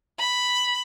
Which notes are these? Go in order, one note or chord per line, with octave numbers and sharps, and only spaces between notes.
B5